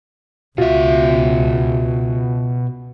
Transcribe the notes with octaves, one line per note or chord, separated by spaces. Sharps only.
C#2 B2 F4 F#4 E5